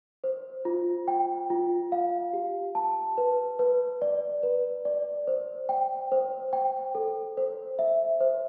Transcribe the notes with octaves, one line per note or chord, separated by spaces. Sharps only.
C5
F4
G5
F4
F5
G4
A5
B4
B4
D5
B4
D5
C5
G5
C5
G5
A4
C5
E5
C5